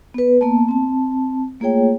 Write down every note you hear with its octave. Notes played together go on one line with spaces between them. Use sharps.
B3 B4
A#3 B3 A5
C4 A5
A3 A#3 F4 G#4 C#5 G5